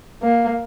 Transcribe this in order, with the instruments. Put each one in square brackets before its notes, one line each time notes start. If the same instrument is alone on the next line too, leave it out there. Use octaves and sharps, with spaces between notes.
[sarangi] A#3